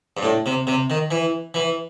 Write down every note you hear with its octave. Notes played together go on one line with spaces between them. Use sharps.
G2
A2
C3
C3
D#3
E3
E3